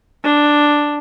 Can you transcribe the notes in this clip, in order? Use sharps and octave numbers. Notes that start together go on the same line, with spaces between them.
D4